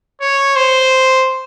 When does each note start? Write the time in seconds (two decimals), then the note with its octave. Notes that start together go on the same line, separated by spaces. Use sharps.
0.21 C#5
0.56 C5